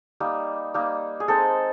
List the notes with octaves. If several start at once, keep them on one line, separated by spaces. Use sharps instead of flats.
G3 A#3 D#4
G3 A#3 D#4
G#4
G#3 C4 D#4 A4